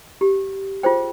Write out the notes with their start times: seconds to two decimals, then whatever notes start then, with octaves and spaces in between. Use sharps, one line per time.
0.21 G4
0.83 F4 G#4 C5 G5